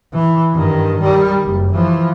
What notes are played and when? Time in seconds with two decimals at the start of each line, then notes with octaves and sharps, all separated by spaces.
0.13 E3
0.54 G2 D#3
1.02 D#3 G3
1.44 F#1
1.74 E3 F3